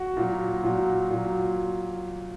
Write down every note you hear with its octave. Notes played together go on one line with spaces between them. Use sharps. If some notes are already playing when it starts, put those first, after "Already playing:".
Already playing: F#4
A#2 F#3
A#2 F#3
A#2 F#3